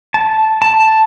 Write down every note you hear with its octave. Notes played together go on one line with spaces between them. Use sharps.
A5
A5